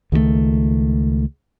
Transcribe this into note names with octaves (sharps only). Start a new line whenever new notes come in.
C#2 D#3 F3 A3